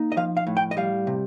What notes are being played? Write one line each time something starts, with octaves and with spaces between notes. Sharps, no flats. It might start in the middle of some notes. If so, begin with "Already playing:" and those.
Already playing: A#3 D#4
D#5
F3 F5
F5
A2
G5
D#5
G3 F5
C3